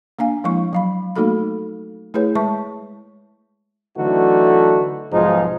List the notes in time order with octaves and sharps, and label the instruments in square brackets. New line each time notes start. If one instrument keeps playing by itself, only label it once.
[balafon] A#3 D4 F5 G#5
F3 G#3 A#3 E4 C#6
F#3 F5 B5
A3 A#3 D#4 F#4 A4 B5
A3 E4 G#4 B4 C#5
G#3 B4 E5 A5 C#6
[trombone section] D3 E3 F#3 A3 D#4 F#4
B1 G#2 F3 G#3 D#4 F4